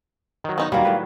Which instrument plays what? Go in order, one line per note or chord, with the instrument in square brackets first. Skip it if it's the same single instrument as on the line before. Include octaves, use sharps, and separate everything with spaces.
[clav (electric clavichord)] D#3 F#3
[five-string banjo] B3 D#4 F#4
[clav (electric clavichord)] D#2 A#2 [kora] F#3 G3 [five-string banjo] A#3 [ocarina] F5
[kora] A2 D#3 [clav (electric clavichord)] B4